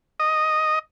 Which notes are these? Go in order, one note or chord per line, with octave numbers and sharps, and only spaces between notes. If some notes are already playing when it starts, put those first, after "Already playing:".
D#5